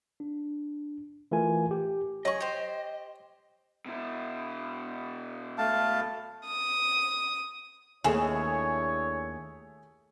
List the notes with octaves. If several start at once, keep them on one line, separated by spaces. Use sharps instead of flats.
D4
E3 A3 F4 A#4 G#5
G4
F#3 C#4 G#4 D#5 C#6
G4 C5
B2 E4
A3 F5 A5
D#6
D#2 A3 D4 E4 G#4 C#5 E7